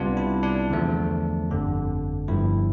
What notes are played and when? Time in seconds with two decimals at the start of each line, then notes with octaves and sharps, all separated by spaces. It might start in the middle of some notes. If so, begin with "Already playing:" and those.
Already playing: C2 C3 G3 B3 D4 F4
0.17 E4
0.43 D4
0.70 E2 D3 F3 A3
1.49 G1 F2 D3
2.28 G1 G2 F3 E4